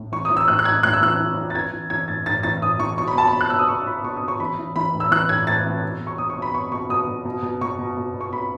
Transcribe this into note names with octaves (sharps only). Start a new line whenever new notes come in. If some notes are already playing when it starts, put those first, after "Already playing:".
Already playing: A2
E3 C#6
E3 D#6
E6
A2 F#6
F#6
A2 G#6
A2 F#6
E6
E3 F#6
E3
E3
A6
E3 G#6
E3
E3 G#6
A2 A6
A2 A6
E3 A6
A2 D#6
E3 C#6
B2 C#6
B5
B2 A5
B5
B2
F#6
B2 E6
D#6
B2 C#6
B2 B5
B2 C#6
D#6
B2
C#6
E3 B5
E3
E3 B5
A2
E6
E3 F#6
A2 G#6
A2 A6
E3
B2
B2
C#6
B2 D#6
C#6
B2
B5
B2 C#6
B2 C#6
B2 D#6
B2
B2
B2
B2 C#6
B2
B2
B2
C#6
B2 B5